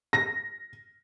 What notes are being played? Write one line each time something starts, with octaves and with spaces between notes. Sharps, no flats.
A#6